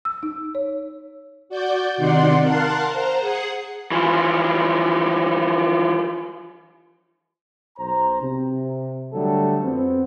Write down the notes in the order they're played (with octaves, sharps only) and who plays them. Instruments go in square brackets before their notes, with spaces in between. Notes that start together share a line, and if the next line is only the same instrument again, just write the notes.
[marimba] E6
D#4
C#5
[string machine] F#4 D5 G6
C3 D#3 D#4 D5 F#5 C6
A#4 F5 F#5 A5 C6 F#6
C5 A#5
G#4 F#5 C7
[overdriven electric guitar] E3 F3
[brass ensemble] B1 C5 A#5
C3
D3 F#3 G3 A3 A4
F2 B3 C4